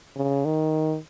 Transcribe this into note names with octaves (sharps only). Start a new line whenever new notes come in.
C#3
D#3